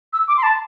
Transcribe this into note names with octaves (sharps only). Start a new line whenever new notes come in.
E6
D6
C6
A5